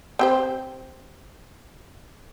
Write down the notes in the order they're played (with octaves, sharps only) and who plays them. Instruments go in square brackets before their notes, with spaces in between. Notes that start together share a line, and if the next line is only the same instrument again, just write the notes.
[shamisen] C4 G4 C5